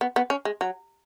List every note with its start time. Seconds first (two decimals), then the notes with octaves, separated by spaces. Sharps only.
0.01 B3
0.16 B3
0.30 C#4
0.45 G#3
0.61 F#3